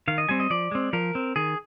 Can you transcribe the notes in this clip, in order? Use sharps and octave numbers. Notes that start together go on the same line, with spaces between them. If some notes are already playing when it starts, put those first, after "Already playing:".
D#3 F5
D#5
G3 C4 G#5
D#5
F3 D5
G#3 C4
F3 A#4
C4
D#3 G#4